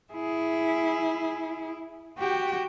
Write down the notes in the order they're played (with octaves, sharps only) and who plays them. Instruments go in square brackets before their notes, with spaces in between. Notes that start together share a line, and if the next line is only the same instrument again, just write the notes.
[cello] E4 [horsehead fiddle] G#4
[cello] F#4 G5 [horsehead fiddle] G4